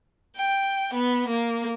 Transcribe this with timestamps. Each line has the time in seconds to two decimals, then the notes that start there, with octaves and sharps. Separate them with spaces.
0.36 G5
0.94 B3
1.29 A#3